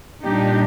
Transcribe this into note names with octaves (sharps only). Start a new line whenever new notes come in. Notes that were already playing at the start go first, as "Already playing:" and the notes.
A#2 G3 D4 D#4 G4